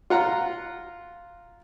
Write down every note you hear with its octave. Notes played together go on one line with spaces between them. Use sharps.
F4 F#5 A#5